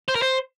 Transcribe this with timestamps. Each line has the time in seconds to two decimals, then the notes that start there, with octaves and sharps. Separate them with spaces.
0.08 C5
0.15 A#4
0.22 C5